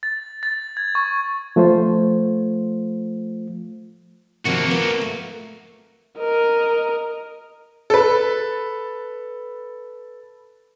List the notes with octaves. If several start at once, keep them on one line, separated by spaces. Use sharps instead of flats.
A6
A6
G#6
C#6
F3 A3 F4 C5
C3 D#3 F3 A#3 F#4
B3 F4 A#4
A3
A#4 D#5
A4 B4